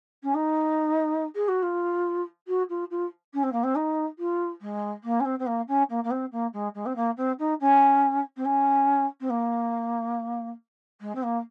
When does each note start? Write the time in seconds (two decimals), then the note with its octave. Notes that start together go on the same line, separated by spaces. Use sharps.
0.23 C#4
0.34 D#4
1.35 G#4
1.48 F#4
1.62 F4
2.47 F#4
2.69 F4
2.90 F4
3.33 C#4
3.43 C4
3.52 A#3
3.63 C4
3.75 D#4
4.18 F4
4.61 G#3
5.03 A#3
5.20 C#4
5.24 C4
5.39 C4
5.46 A#3
5.68 C#4
5.89 A#3
6.03 A#3
6.10 C4
6.31 A#3
6.53 G#3
6.74 G#3
6.85 C4
6.95 A#3
7.17 C4
7.39 D#4
7.60 C#4
8.36 C4
8.45 C#4
9.20 C4
9.29 A#3
11.00 G#3
11.15 C4
11.22 A#3